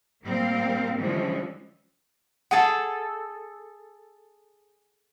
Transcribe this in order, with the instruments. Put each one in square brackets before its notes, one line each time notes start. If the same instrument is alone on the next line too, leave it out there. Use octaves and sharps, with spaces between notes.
[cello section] A2 G3 A#3 C4 A#4 F5
D3 E3 F3 G3 G#3 C#4
[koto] G#4 A4 [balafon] F#5